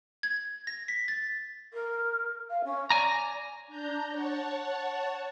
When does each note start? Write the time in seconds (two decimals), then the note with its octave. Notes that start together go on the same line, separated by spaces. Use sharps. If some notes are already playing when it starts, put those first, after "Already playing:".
0.23 G#6
0.67 A#6
0.88 B6
1.08 A6
1.73 A#4
2.50 F5
2.64 C#4
2.90 D5 G#5 A#5
3.68 D4 A#5 G6
4.10 C#5 F#5 A5